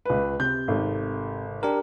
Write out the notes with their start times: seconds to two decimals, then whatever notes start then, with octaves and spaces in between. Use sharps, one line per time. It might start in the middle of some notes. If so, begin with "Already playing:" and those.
0.05 C#2 B4
0.40 C3 G6
0.68 G#1 A3
1.63 D4 G4 A#4